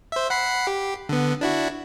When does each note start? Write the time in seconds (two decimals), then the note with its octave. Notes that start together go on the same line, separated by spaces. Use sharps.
0.12 C5 E5
0.30 F#5 B5 C7
0.67 G4
1.09 D3 B3
1.41 D4 E4 F#4